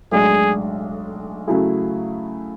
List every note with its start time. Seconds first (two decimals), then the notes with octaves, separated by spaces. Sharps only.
0.12 B1 A2 G#3 D4 G#4
1.47 C#3 F#3 A3 E4 G#4